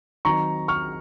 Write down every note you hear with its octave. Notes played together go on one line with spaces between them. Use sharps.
D#3 F#3 C4 D#4 A#5 C#6
C#6 F6